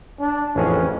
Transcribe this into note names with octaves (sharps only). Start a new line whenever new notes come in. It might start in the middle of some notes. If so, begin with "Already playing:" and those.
D4
A1 F2 C#4 G#4